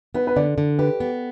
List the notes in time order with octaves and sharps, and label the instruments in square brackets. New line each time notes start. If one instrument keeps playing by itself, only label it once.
[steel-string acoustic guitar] B3 [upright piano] B4
[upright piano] B4
[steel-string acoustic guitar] D3 [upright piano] D5
[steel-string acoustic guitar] D3
[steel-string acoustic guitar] G4 [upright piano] B4
[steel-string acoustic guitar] B3